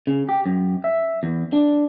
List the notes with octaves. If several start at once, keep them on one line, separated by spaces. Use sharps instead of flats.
C#3
G4
F#2
E5
E2
D4